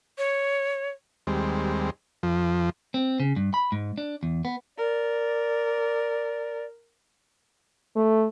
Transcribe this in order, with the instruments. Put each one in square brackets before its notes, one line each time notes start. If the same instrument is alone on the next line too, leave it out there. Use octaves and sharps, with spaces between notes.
[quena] C#5
[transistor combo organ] D#2 G3 G#3 C4
F2 F3
[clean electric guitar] C4
C#3
G2
B5
G#2
D4
E2
B3
[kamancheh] A#4 [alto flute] D5
[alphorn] A3